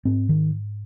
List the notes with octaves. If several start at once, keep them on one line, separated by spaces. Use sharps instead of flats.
G#2 C4
D#3